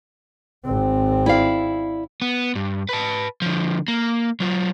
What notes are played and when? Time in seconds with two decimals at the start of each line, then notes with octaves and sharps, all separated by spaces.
0.64 G#1 C4
1.26 E4 D5 F5
2.22 B3
2.56 G2
2.89 B4 A5
3.42 D3 F3
3.88 A#3
4.40 F#3 F4